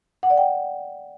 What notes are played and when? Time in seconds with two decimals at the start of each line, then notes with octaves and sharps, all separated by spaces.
0.23 F#5
0.30 D5
0.37 G5